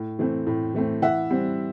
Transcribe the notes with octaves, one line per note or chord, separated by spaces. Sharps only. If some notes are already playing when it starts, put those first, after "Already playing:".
Already playing: A2
E3 A3 C4
A2
E3 A3 C4
E3 E5 F#5
G3 C4